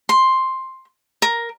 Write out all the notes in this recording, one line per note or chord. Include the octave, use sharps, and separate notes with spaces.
C6
A#4